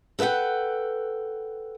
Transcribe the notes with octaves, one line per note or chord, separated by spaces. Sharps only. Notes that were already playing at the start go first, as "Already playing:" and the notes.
A4 B4 D#5 F#5 G5